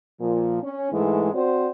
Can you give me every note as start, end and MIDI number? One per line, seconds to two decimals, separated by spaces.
0.20 0.60 46
0.20 0.60 53
0.62 0.89 61
0.92 1.33 44
0.92 1.33 52
0.92 1.33 56
0.92 1.33 57
1.34 1.68 60
1.34 1.68 66
1.34 1.68 72
1.34 1.68 74